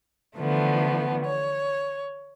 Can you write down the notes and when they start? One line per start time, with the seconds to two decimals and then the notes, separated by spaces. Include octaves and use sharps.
0.37 D3 E3 F3 A3 B3
1.25 C#5